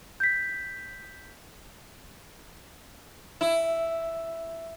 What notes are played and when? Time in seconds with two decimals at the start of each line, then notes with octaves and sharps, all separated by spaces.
0.20 G6 B6
3.41 E4